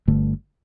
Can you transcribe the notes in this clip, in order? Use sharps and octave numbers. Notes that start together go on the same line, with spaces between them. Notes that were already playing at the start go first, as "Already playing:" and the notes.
G1 G2 D3 A3